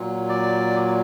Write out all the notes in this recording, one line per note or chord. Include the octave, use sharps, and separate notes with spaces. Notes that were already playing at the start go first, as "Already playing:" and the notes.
Already playing: A#2 F#3
D5